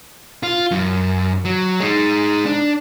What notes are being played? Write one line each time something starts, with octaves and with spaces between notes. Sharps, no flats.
F4
F#2
F#3
G#3 D#4
D4